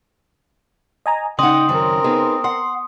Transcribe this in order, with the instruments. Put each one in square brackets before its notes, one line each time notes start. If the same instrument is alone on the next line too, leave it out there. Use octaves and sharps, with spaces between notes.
[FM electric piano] D#5 G#5 A#5
[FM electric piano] C#3 [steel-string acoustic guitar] D#4 D#5 [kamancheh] F#5 G5 [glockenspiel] C6 D#6
[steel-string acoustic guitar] F#2 D#3 C#4 [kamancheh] C4 A#4
[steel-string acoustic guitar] B3 D#4 G#4
[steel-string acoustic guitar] F#5 [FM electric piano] C6